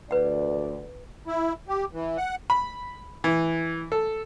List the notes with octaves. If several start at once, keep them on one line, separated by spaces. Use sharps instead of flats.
D2 B4 D5 F#5
E4
G4
E3
F#5
B5
E3
A4